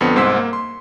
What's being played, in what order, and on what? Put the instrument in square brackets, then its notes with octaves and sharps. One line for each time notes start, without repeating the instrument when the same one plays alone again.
[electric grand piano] F2 D3 B3 C4 C#7
C2 G#2 C5 C6 E6 B6
A#3
C6